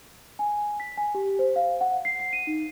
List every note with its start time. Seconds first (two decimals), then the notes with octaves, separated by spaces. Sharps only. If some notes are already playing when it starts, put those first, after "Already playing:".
0.39 G#5
0.80 B6
0.97 G#5
1.15 G4
1.39 C5
1.56 F5
1.81 F#5
2.05 C7
2.20 C7
2.33 D#7
2.47 D#4